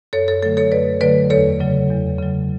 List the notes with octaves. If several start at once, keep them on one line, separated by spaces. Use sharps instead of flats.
F#2 A4 C#5
A4 C#5
D3 F#3 A3 A4 C#5
A4 C#5
F#2 B4 D5
D3 F#3 A3 B4 D5
E2 A4 C#5
C#3 F#3
E2
C#3 F#3